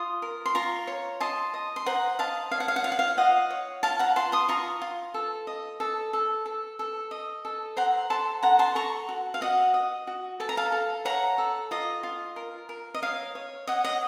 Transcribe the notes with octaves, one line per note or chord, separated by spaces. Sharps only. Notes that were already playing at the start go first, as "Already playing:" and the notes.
Already playing: F4 C6 D#6
A#4
C6
F4 A#5 C#6
C#5
D#5 A5 C6
D#5
C6
C5 F#5 A#5
D#5 F5 A5
C#5 F5
F#5
F5
F#5
F4 F5
F#5
F5
F4 D#5 F#5
C#5
F4 F5 A5
F#5 A#5
F4 A5 C6
C6 D#6
F4 A#5 C#6
F4
A4
D#5
A4
A4
A4
A4
D#5
A4
C5 F#5 A#5
A4 A5 C6
A4 F#5 A#5
A5 C6
A4 A#5 C#6
F#4
F5
F#4 D#5 F#5
D#5
F#4
A4 A5
A#5
F5 A5
A4
C#5 F#5 A#5
A4
F4 D#5
F4
A#4
A#4
D#5
C#5 F5
C#5
C#5 D#5 F#5
D#5 F#5